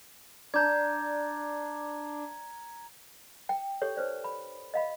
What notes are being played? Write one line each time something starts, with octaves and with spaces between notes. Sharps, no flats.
D4 D5 A#5 G6 G#6
G5
G4 A4 C#5
D#4 B4 C5 D5
B5
D#5 F5 B5